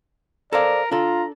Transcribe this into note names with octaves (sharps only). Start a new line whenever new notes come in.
A4 A#4 C5 D5 F5
D4 F4 A4 A#5